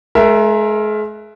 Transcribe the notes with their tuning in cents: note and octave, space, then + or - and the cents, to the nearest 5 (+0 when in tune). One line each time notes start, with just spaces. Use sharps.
G#3 +40 A#4 +5 E5 +15